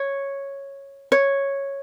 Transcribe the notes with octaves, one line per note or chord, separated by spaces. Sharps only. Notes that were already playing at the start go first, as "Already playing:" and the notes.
Already playing: C#5
C#5